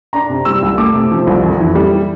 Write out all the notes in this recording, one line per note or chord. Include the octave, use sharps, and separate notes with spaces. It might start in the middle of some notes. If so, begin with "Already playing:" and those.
D4 A#5
C3
G3 E6
C2
A3 D6
C3
F3
C2
F2
E3
G3